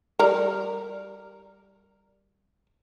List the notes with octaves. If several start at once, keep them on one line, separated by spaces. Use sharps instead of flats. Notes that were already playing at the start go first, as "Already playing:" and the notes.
G3 A#4